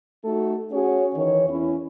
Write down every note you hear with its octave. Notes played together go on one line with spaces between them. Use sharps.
A3 D#4 F#4 A4
C#4 F#4 G#4 C#5
D#3 E3 C#5
E2 C#4 E4